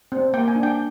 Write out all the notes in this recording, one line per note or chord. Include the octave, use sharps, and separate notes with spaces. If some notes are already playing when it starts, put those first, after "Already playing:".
C4
A#3 G5
G#5
D4
G5